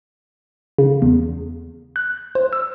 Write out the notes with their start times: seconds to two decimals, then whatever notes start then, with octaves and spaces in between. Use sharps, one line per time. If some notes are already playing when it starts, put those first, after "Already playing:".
0.79 C#3
1.02 E2
1.96 F#6
2.35 C5
2.53 E6